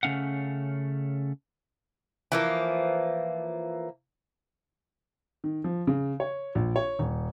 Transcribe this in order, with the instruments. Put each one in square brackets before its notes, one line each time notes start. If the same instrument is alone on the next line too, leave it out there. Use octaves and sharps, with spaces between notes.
[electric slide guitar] C#3 A3 C#4 F5 F#5
[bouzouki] E3 F3 A#3
[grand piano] D#3
F3
C#3
C#5
A#1
C#5
D#1